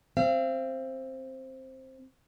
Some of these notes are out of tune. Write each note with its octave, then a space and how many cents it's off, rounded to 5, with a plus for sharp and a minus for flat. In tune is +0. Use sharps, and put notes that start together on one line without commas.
C4 +10 F5 -35